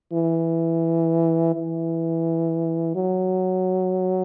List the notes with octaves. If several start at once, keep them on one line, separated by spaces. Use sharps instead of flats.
E3
E3
F#3